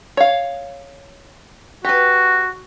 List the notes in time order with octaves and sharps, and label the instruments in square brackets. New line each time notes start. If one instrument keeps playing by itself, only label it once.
[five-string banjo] C#5 F5
[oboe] F#4 [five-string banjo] G4 B4